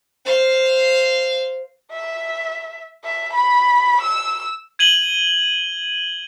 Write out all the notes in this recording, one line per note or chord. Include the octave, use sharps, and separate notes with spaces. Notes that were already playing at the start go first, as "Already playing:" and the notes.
C5 F5
E5
E5
B5
E6
G#6 D#7 F#7 G7